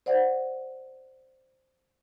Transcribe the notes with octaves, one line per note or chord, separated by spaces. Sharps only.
C5 D5 F#5